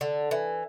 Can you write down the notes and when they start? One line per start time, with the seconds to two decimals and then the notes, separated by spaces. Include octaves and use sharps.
0.01 D3
0.31 E3